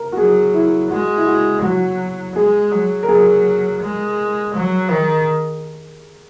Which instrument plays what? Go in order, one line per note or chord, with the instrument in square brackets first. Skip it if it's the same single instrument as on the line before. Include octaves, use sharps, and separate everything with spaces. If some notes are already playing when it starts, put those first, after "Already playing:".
Already playing: [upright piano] A#4
F#4
[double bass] F#3 [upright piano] G#4
[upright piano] E4
[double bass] G#3 [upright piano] F#4
[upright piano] E4
F#4
[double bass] F#3 [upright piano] F#4
[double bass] G#3 [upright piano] G#4
[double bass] F#3
[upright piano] A#4
[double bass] F#3 [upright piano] G#4
[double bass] G#3
F#3
D#3